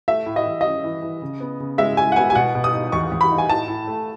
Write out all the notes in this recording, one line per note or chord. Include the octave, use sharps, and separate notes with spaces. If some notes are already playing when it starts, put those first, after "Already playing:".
A3 E5
A2
D#5
E3
C#4 D#5
E3
E3
C#3
B3
C#3
G#3 E5
G#3 G#5
F#5
B3 G#5
G#5
B2 F#5
B2
D#6
D#4
E2 C#6
E2
B5
D#4
G#5
A2 A5
A2
A3